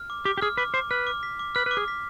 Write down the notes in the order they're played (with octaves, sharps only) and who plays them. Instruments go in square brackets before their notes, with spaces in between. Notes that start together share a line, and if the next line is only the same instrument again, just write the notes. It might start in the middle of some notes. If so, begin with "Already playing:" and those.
Already playing: [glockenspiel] F6
D6
[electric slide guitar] G4 [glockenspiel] D6
[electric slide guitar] G4
[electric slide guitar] G#4 [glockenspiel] F6
[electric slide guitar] B4 [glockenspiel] D6
[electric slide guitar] C5 [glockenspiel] D6
[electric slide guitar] B4 [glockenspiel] F6
[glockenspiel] D6
B6
D6
[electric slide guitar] B4 [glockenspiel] F6
[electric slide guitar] B4 [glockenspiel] D6
[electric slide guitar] G#4
[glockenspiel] B6